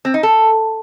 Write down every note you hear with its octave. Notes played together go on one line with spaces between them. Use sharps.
C4
D#4
A4